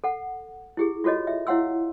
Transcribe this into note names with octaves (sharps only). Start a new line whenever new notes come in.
A4 F#5
E4 G4 G#4
F4 F#4 A4 C#5 D#5
E5
E4 C#5 F5 F#5 C6 E6